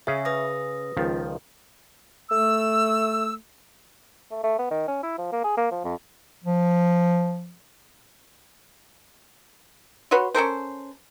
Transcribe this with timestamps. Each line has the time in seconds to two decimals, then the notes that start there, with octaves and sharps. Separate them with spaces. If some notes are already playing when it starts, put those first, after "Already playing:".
0.07 C#3 C#4 G#4 E5
0.25 B4 D#6 A#6
0.97 C#2 D#3 F3
2.31 A3 E6
4.31 A3
4.44 A3
4.59 B3
4.71 D#3
4.88 C#4
5.03 E4
5.18 F3
5.33 A#3
5.44 G#4
5.58 A#3
5.71 F3
5.85 F2
6.44 F3
10.11 F#4 B4 C#5 C6
10.35 C#4 A4 A#4 C5